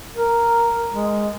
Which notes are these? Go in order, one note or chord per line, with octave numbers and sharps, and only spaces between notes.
A#4
G#3